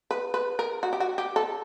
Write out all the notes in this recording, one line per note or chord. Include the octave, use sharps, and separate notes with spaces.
B4
B4
A#4
F#4
G4
F#4
G4
A4